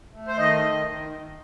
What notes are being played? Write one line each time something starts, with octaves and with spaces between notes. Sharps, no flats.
A3
C5
D#3 D#5
D#3
D#3